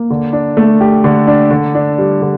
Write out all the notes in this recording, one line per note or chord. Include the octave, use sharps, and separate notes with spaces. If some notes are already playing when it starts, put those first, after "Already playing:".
Already playing: A#3
D3
D4
A3
G4
D3
D4
D3
D4
G3
D3